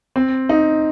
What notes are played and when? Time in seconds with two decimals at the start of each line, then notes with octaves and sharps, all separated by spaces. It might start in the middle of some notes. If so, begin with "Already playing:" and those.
0.16 C4
0.49 D#4